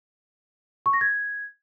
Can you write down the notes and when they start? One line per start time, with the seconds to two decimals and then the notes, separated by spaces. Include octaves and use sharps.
0.86 C#6
0.93 A#6
1.01 G#6